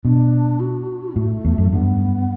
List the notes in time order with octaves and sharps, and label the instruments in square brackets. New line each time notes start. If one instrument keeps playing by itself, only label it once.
[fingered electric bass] B2 [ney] D4
[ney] F#4
[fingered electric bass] A2 [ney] A3
[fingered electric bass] E2
F#2
[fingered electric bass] G2 [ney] B3